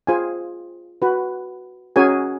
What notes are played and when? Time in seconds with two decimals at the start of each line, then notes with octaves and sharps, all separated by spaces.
0.07 F4 G#4 C5 G#5
1.02 F#4 B4
1.96 C#4 F#4 G#4 A#4 C#5 G#5